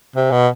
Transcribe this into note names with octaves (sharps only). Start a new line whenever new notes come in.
C3
B2